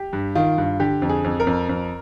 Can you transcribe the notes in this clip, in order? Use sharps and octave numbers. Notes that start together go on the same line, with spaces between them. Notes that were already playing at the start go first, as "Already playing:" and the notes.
Already playing: G4
G2
D#3 F4
G2
D3 G4
F2
G#4
F2
A#4
F2
F2